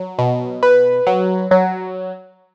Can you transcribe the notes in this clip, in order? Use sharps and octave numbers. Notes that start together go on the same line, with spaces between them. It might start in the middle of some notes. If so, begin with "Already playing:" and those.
Already playing: F#3
B2
B4
F#3
F#3